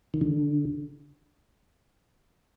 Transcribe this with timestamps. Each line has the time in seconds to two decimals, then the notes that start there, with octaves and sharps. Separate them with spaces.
0.14 D#3
0.21 D3